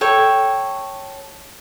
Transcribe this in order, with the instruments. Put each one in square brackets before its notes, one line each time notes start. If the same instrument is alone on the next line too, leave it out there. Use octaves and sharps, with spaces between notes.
[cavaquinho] A4 C#5 G5